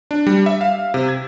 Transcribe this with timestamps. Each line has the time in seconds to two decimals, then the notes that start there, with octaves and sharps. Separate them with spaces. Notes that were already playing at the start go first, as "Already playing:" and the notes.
0.11 D4
0.27 G3
0.46 E5
0.61 F5
0.94 C3
1.09 G#6